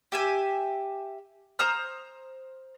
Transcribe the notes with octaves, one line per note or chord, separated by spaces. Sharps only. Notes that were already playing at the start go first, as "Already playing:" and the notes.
G4 E5 G#5
C5 A#5 D#6 F6